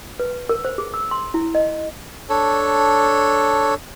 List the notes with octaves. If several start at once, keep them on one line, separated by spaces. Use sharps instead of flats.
B4
A#4
C5
G#4
E6
C6
E4
D#5
D4 A4 C#5